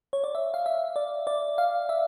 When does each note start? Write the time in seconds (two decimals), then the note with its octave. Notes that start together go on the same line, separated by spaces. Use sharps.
0.13 C#5
0.24 D5
0.35 E5
0.54 F5
0.66 E5
0.96 D5
1.27 D5
1.58 F5
1.89 E5